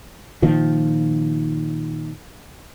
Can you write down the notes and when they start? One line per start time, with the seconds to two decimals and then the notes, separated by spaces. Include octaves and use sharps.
0.42 A#2 D#3 F3